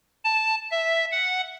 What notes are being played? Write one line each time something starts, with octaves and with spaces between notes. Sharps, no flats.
A5
E5
F#5